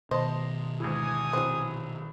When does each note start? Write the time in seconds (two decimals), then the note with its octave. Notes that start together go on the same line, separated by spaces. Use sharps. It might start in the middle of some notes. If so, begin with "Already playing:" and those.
0.11 B2 D#3 C5 D#5 A5 C6
0.80 D2 G#2 E3 G#5 D#6
1.33 A#1 E3 F#3 C4